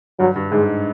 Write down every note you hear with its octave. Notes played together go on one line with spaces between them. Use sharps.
G2 F#3
G2
G#2 G#3